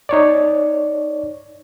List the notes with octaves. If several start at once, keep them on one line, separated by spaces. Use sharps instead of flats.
D#4 C#5 D5